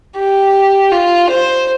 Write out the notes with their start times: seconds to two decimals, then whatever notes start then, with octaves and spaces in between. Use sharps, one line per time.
0.17 G4
0.92 F4
1.29 C5